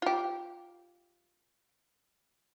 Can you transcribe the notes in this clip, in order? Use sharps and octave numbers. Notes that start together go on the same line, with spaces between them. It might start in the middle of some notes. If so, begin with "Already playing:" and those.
F4 G4